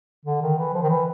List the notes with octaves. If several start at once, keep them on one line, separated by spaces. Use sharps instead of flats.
D3
D#3
E3
F3
D#3
E3